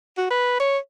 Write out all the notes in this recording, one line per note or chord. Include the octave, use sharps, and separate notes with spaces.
F#4
B4
C#5